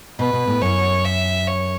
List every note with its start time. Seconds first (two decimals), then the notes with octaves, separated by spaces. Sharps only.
0.19 B2 B4
0.33 B2
0.47 A2
0.62 F#2 C#5
1.05 E5
1.47 C#5